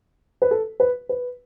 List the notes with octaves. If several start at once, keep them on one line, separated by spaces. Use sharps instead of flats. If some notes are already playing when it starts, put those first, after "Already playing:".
B4
A4
B4
B4